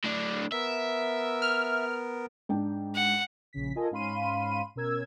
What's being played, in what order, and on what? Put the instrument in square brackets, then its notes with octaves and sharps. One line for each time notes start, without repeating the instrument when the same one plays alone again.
[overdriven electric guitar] A2 D4
[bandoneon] B3 A#4 [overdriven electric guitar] E5
[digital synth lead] F6
[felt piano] G#2 D4 G5
[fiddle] F#5
[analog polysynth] A#1 C#3 B6
F4 A4 A#4 D#5 G#5
G#2 C#4 F5 B5 C6 D#7
B2 C#4 A#4 E6 G#6